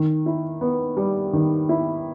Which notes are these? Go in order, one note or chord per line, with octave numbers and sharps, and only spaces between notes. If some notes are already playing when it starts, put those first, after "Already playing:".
Already playing: D#3
E4
B3
G3
D#3
E4